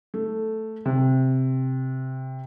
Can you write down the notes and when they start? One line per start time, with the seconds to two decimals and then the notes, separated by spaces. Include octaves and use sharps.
0.14 A3
0.86 C3